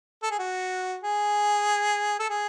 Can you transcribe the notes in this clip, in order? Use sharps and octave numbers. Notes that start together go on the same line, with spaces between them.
A4
G#4
F#4
G#4
A4
G#4